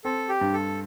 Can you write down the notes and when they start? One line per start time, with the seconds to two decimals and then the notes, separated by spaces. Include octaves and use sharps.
0.04 C4 A4
0.29 G4
0.41 G2
0.54 A4